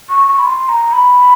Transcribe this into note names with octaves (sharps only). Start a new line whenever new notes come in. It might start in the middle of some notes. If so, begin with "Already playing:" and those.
C#6
C#6
B5
C6
A#5
B5